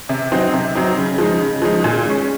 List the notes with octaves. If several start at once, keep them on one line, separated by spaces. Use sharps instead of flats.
C3
F#3 C4 D#4
C3
F#3 C4 D#4
C#3
F3 G#3 D#4
C#3
F3 G#3 D#4
A#2
G#3 C#4